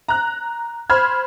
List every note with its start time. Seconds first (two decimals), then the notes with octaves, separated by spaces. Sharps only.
0.08 A#5 F#6
0.90 C5 B5 F6 G#6